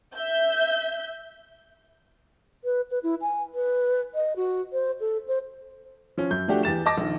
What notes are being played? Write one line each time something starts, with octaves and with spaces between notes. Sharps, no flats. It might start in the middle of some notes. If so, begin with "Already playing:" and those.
E5 G6
B4
B4
E4
G#5
B4
D#5
F#4
C5
A4
C5
F3 C#4
F#2 G6
F3 A3 D4 F#4 G4
E2 G4 A6 E7
D#5 A5 D6 A#6
A#1 D#3